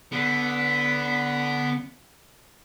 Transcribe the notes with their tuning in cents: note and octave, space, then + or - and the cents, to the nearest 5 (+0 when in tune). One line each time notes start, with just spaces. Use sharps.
D3 -20 B3 +0